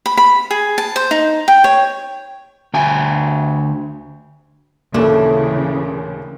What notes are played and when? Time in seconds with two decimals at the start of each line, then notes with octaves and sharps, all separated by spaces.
0.06 B5
0.17 B5
0.51 G#4
0.78 A5
0.96 C5
1.11 D#4
1.48 G5
1.64 C#5
2.74 D2 G5 G#5
4.94 D#2 A#2 C#3 E3 A3 D4